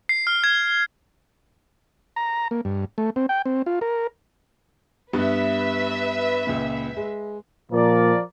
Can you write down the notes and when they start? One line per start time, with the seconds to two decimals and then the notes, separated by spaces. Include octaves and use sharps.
0.09 C7
0.27 F6
0.44 G#6
2.16 A#5
2.51 A#3
2.65 G2
2.98 A3
3.16 C4
3.29 G5
3.46 C4
3.66 F4
3.81 A#4
5.13 G2 B3 B4 E5
6.47 C#2 A#2
6.97 G#3
7.72 A#2 F3 A#4 D5